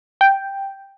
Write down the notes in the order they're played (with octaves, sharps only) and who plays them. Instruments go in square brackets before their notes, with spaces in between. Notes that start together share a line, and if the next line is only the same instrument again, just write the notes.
[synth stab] G5